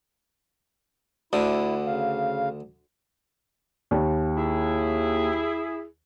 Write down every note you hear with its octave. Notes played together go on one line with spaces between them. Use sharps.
D2 D3 E4
C#3 F5
D#2
E4 G#4